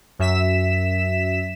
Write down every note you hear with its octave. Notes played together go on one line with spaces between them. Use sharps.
F#2 E5 B6 E7